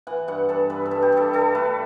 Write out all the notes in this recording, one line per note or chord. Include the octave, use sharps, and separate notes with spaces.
E3 F#5
G2 F#5
G2 A4
G2 B4
A4
G2
G4
G2 A4
G2 A4
A3 B4